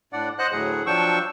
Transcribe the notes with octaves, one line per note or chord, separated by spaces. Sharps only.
A2 D4 D5 F#5
C5 D#5 F#5 F#6
D2 A2 F#3 G#4 F#5
F3 F#3 D4 G5 C#6 E6